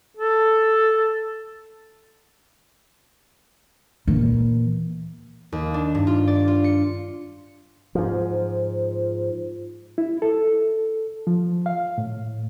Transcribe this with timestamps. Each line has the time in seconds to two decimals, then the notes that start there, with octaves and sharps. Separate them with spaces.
0.17 A4
4.08 A#2 E3
5.52 D#2
5.74 D4
5.95 G2
6.07 F4
6.27 D5
6.48 F4
6.64 C#7
7.95 G#2 F3
9.98 E4
10.22 A4
11.27 F3
11.66 F5
11.98 A2